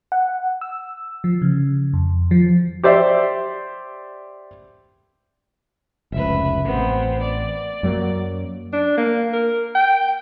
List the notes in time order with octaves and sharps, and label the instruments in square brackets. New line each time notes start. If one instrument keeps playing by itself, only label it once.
[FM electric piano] F#5
E6
F3
C#3
F2
F3
[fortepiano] G4 C5 D5 E5
[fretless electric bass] F1 C#2 [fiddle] B4 E5
[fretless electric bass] A1 [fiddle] B3 C4
[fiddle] D5
[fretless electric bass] F#2 F#3 A#3
[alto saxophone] D4
A#3
A#4
G5